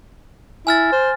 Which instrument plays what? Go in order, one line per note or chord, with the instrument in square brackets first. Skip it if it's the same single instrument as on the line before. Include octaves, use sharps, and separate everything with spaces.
[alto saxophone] E4 [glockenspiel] G#5 F6 A6
[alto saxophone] C5